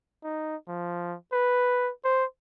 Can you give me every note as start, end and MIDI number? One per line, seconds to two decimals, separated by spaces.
0.24 0.56 63
0.68 1.16 53
1.33 1.91 71
2.04 2.25 72